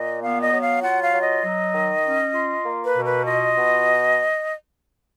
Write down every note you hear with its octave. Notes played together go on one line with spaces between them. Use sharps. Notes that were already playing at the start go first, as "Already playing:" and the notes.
Already playing: A#2 D#5
B3 F5
D#5
F#3
F5
F4 F#5
F5
F#3
D#5
F#3
D#3
C#4
F4
A#3
B4
B2
B4
F4 D#5
B2